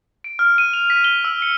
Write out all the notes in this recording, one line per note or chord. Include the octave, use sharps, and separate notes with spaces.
D7
F6
D#7
F7
B6
G7
E6
C#7